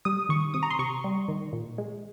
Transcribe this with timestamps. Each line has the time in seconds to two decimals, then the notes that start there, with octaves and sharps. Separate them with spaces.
0.05 G3 D#6
0.29 D#3 C#6
0.54 C3 D#6
0.63 A#5
0.71 C6
0.79 C3 C#6
1.04 G3
1.28 D#3
1.53 A#2
1.78 G#3